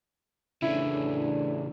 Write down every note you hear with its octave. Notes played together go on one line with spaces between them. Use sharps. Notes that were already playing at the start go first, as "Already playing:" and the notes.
A2 C#3 E3 D4 E4